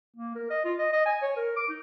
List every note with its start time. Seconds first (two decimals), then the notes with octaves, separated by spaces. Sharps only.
0.16 A#3
0.35 A#4
0.50 D#5
0.65 F4
0.78 D#5
0.92 D#5
1.06 G#5
1.22 C#5
1.36 A#4
1.56 D6
1.69 D#4